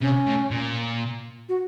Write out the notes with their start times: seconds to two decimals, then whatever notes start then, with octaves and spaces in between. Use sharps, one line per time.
0.01 C3 C#4
0.26 A2
0.51 A#2
1.49 F#4